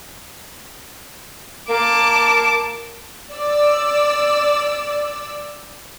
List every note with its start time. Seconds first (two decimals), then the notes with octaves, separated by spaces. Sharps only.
1.69 A#3 A5 D6
3.34 D5 E6